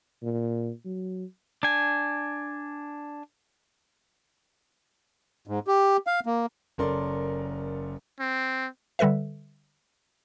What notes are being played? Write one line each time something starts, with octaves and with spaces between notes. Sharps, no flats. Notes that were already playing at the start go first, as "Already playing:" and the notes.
A#2
F#3
D4 G#5
G#2
G4
F5
A#3
F#1 C#4 A4 A#4 D5 C6
C4
D3 G3 A4 B4 E5